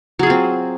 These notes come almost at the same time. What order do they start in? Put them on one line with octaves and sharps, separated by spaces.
F#3 G#4 F4 C4